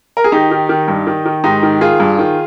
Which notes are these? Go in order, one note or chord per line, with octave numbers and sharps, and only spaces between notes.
A#4
G#4
D#3 D#4 G4
D#3
D#3
G2
D#3
D#3
G#2 D#4 G4
D#3
D#3 F4 G#4
G2
D#3